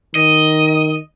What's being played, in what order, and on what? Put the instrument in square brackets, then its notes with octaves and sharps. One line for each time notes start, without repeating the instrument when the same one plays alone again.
[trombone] D#3 [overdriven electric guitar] D#5